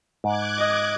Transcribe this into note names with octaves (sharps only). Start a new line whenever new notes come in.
G#2 D6 F#6 G#6
D#5